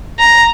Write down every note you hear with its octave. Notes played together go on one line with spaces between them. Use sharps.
A#5